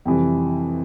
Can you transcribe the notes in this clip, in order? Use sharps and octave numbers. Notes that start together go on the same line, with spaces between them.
F2 C3 E3 G3